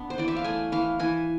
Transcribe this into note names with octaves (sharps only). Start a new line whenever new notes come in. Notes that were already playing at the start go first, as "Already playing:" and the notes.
Already playing: B3 D4
C5
E3 D5
E5
F5
A3 G#5
E3 F5
E3 G#5